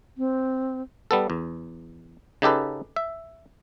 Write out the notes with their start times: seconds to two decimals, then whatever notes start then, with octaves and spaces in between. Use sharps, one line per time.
0.18 C4
1.11 G3 B3 A4
1.30 E2
2.42 C#3 D#4 G4 A4 B4
2.96 E5